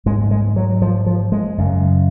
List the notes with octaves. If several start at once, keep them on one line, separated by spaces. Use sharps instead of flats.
G#2 G#3
G#3
F#3
F3
F3
G#3
F#2 C#3